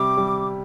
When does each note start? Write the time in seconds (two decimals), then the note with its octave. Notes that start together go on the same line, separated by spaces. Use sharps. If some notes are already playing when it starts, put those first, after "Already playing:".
Already playing: C3 G3 D6
0.17 G3